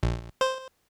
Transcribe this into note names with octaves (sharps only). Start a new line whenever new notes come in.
A#1
C5